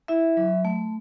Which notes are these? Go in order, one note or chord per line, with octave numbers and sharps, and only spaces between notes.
E4 E5
F#3
A3